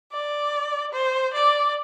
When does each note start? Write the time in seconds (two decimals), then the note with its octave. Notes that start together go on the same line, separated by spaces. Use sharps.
0.12 D5
0.93 C5
1.34 D5